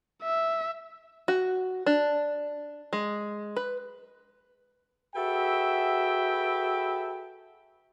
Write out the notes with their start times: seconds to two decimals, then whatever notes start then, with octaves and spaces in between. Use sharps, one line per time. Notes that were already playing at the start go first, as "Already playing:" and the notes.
0.23 E5
1.28 F#4
1.86 D4
2.93 G#3
3.56 B4
5.15 F#4 G#4 A4 B4 E5 G5